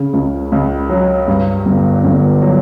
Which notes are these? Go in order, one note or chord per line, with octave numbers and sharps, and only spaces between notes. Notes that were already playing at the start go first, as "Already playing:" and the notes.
Already playing: C#3
C#2
C#2
F#3
G2
G1
G1
F#3